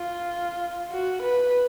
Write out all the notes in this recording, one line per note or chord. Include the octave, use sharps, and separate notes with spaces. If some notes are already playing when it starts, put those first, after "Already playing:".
Already playing: F4
F#4
B4